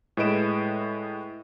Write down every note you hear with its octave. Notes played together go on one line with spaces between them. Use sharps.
A2 G#3 B4 D#5 D7 E7